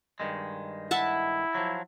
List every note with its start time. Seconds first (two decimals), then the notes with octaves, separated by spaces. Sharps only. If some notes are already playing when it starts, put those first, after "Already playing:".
0.20 G2 D#3 G#3
0.91 E4 E5 F#5 A5
1.55 F3 F#3